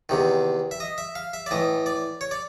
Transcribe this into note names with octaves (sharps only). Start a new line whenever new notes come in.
E2 C3 D#3
E5
D#5
E5
F5
E5
D5
A2 E3 D#5
D5
C#5
D5